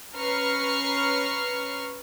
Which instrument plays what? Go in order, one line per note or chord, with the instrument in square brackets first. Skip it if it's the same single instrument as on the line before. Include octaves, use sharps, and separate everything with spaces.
[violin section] C#4 B4 A#5 C#6 F6 C7